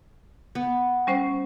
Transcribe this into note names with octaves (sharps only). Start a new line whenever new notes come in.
B3
G3 C#4 C5